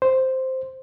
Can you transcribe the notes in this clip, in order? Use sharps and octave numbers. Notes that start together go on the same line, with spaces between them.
C5